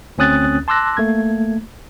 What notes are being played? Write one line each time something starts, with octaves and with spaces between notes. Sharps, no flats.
D2 C4 C#4 D#6 F#6 A6
A5 C6 D6 E6 F#6 A#6
A3 A#3 G#6